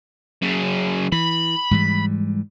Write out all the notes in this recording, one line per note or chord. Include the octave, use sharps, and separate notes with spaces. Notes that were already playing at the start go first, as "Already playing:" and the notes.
F#2 C#3
E3 B5
G#2 E3 G3